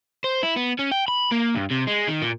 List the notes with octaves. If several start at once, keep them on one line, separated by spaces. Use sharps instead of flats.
C5
E4
B3
C#4
G5
B5
A#3
G2
C3
G#3
D#3
A#2